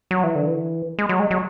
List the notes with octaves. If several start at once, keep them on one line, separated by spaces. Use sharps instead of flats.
F#3
E3
D3
E3
G#3
F#3
G#3
F#3